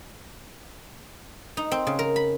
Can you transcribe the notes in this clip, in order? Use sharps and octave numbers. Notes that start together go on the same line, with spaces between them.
D#4
C4
C#3
A#4
B5